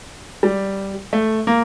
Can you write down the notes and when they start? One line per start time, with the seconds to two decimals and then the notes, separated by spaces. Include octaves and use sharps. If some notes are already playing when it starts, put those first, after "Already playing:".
0.43 G3
1.13 A3
1.47 A#3